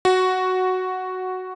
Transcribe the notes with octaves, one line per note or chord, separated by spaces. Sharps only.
F#4